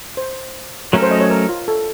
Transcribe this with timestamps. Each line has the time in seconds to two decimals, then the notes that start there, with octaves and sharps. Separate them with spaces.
0.17 C5
0.93 F#3 A3 C#4 A4 A#4
1.02 C5
1.11 D#5
1.21 C#5
1.30 A#4
1.49 F4
1.68 A4